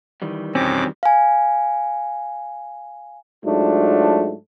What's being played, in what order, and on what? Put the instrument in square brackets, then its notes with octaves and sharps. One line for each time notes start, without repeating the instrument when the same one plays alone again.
[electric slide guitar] D#3 E3 G3
[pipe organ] F2 B2 D6 [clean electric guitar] C4 C#4
[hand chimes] F5 G#5
[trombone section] G#2 F#3 A3 D4 F4